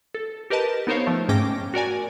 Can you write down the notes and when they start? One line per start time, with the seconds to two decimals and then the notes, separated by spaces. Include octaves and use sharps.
0.14 A4
0.50 G4 A#4 B4 D#5 A5
0.87 B3 D#4 A#4 C5 C#5 F5
1.07 F3 A3
1.28 G#2 A3 C#4 G5 D6 A#6
1.74 F#4 A#4 D5 G#5